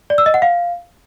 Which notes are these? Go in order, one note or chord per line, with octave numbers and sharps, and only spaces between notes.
D5
E6
D#5
F#5
F5